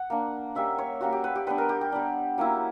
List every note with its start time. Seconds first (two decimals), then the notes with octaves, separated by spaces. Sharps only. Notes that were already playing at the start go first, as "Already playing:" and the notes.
Already playing: F#5
0.10 A#3 D4
0.55 G3 A#3 C#4 E5
0.78 C#5
1.01 G3 A#3 C#4 F#4
1.12 G4
1.24 B4
1.35 G4
1.47 G3 B3 D4 B4
1.58 A#4
1.69 G4
1.81 G4
1.92 G3 B3 D4
2.38 F#3 A#3 C#4 E4